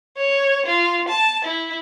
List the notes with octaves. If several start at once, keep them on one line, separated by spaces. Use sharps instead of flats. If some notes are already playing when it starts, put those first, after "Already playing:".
C#5
F4
A5
E4